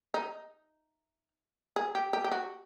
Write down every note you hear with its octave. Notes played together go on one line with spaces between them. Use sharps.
D#4
G#4
G4
G4
G4
F#4